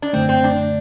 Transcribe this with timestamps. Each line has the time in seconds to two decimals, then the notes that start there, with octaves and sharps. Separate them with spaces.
0.02 D4
0.13 F#2 D3 A3 C4
0.29 C4
0.44 D4